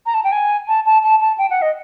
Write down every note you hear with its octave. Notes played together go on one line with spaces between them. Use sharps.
A#5
A5
G5
G#5
A5
A5
A5
A5
G5
F#5
D#5